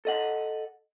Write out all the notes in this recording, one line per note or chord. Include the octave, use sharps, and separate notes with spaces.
A4 D#5 F#5